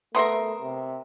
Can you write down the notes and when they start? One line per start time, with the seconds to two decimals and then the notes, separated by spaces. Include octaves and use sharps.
0.15 A3 B3 A#4 E5 C6 D#6
0.62 C3